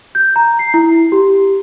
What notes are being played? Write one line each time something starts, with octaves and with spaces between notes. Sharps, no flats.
G6
A#5
C7
E4
G4